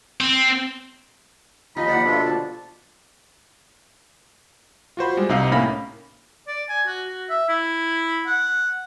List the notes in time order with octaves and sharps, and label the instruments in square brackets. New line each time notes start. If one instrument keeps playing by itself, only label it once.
[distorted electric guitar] C4
[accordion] D#2 F3 D#5 [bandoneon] D#4 [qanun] F4 G4 [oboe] B5
[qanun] F3 A#3 C5 [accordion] D5 F#5
[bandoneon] B2 D4 [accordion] A3 F4 A4
[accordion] D3 F3 [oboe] A5
[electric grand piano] F4 F#4 C5 B5
G3 G#3
C2 C3 D#4 F5
A2 A#3 C#4 F5 B5 A#6
[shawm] D5
G#5
F#4
F#4
E5
E4
F#5